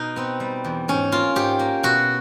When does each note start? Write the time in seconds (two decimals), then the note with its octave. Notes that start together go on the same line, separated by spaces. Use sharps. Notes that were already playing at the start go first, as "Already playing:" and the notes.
Already playing: B2 D#4
0.16 B3 C4
0.40 G3
0.65 E2
0.88 G#2 C#4
1.12 A#3 F4
1.36 G#2 G4
1.59 A#3
1.83 B2 F#4